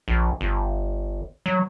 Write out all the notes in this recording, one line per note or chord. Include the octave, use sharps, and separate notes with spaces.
A#1
G1
F#3